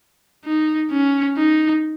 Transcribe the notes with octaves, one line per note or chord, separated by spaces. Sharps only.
D#4
C#4
D#4